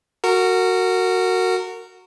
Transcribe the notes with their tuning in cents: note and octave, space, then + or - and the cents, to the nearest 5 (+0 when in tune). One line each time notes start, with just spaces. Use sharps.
F#4 +0 A#4 -25